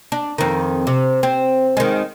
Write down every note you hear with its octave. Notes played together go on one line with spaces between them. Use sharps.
D4
F2 D#3
C3
C4
D#3 G#3